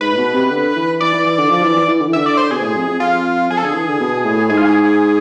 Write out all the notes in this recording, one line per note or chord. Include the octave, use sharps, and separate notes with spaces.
G#2 B4
A2
B2
C3
D3
E3
E3 D5
E3
E3
D3
F3
E3
E3
E3
D3
E3
D3 E5
D5
C5
B2 G#4
A2
F2
F2
F2 F4
F2 G#4
A4
D3 G#4
E3
D3
B2
A2
G#2 G#4
F4
G#4